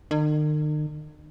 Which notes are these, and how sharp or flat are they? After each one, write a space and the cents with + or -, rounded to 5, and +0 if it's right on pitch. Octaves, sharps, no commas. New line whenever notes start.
D#3 -45